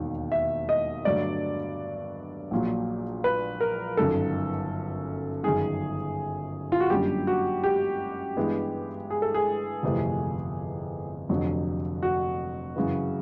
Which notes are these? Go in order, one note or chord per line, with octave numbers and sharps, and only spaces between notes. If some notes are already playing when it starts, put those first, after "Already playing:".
Already playing: E1 D#2 D#3
E5
D#5
G2 D3 F#3 A3 D5
A#1 A#2 F#3
B4
A#4
G1 F#2 D#3 A4
G1 F#2 D#3 G#4
F4
F#4
F#2 D3 G3 A#3 G4
F#4
G4
G2 E3 G#3 B3
G#4
A4
G#4
G1 F2 C3 E3 A3
F1 F2 D3 F#3
F#4
F#2 C#3 E3